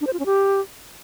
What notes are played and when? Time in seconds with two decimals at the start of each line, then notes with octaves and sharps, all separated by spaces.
0.01 D4
0.07 C5
0.13 F4
0.19 C#4
0.26 G4